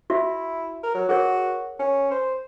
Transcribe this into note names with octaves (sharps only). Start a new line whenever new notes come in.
E4 F#4 E5
A#4
F#3
F#4 G#4 A#4 C#5
C#4
C5